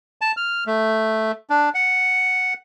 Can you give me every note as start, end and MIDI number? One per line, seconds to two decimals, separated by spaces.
0.21 0.32 81
0.37 0.64 89
0.67 1.32 57
1.50 1.69 62
1.75 2.54 78